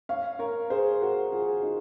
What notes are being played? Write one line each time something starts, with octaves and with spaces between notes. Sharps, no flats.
C#5 F5
A#4 C#5
G#4 C5
F#4 A#4
F4 G#4
D#4 F#4